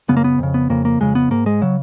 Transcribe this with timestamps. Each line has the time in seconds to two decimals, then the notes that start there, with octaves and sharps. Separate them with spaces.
0.08 F#2 C#3 B3
0.17 A#3
0.24 B3
0.39 F2 C#3
0.54 B3
0.70 F2 C#3 A#3
0.85 A#3
1.00 F2 C#3 G#3
1.15 B3
1.31 G#2 A#3
1.46 G#3
1.61 C#3 F#3